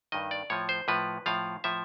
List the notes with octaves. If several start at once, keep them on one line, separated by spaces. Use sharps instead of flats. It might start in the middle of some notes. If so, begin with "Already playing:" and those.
G2 D#3 D#5
D5
A2 F3 C#5
C5
A2 F3 B4
A2 F3 F5
A2 F3 E5